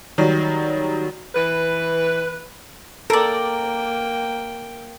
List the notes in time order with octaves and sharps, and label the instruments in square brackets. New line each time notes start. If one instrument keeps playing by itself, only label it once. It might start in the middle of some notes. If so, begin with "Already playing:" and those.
[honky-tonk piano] D#3 F#3 G3
[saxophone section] E3 B4
[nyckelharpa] A#3 G5 [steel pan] A4 [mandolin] A#4 D5